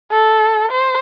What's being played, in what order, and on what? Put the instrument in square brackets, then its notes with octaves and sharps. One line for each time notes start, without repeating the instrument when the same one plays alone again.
[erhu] A4
C5